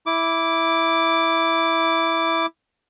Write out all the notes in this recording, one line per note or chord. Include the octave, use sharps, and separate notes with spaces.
E4 D6